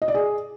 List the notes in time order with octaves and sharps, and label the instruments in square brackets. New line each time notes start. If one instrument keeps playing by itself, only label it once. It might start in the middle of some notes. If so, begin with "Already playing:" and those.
[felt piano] D#5
D5
G#4